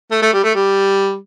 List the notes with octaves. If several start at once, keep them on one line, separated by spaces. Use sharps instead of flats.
A3
A3
G3
A3
G3